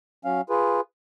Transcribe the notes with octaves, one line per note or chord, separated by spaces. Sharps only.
F#3 C#4 F5
F4 G#4 B4